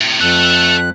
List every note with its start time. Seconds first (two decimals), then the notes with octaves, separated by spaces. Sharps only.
0.01 A2 C3
0.21 F2 A3 A4 F#6